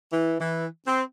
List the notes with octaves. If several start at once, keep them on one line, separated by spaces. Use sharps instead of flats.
E3
E3
C4